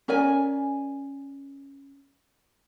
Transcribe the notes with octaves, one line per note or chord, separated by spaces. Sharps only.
C#4 A#4 D5 G#5